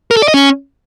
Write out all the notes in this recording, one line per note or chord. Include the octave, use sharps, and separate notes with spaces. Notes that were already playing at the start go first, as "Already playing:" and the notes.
A#4
A4
D5
D#5
C#4